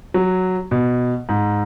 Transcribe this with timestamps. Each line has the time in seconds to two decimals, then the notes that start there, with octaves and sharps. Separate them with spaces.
0.14 F#3
0.71 B2
1.29 G#2